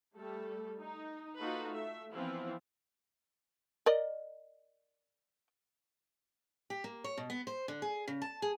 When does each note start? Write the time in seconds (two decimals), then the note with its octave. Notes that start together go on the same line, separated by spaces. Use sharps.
0.16 G3 A3 A4
0.79 D#4
1.38 A#3 D#4 F4 F#4 A4 B4
1.71 A3 E5
2.13 E3 F3 B3 C4 E4 F4
3.86 A#4 D5 D#5
6.70 G4
6.84 A#3
7.04 C#5
7.18 B2
7.30 B3
7.47 C5
7.68 D3
7.82 G#4
8.08 C#3
8.22 A5
8.42 G#4